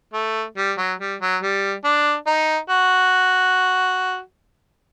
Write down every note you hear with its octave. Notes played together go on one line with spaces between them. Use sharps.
A3
G3
F#3
G3
F#3
G3
D4
D#4
F#4